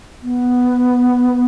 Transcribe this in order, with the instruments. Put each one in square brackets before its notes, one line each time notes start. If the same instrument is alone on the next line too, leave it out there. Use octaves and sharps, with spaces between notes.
[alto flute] B3